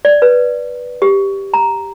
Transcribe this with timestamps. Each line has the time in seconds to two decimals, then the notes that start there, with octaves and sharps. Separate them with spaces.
0.05 D5
0.22 B4
1.02 G4
1.54 A#5